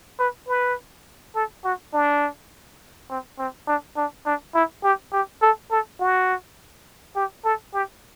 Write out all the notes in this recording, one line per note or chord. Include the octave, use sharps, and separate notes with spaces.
B4
B4
A4
F#4
D4
C4
C4
D4
D4
D4
E4
G4
G4
A4
A4
F#4
G4
A4
G4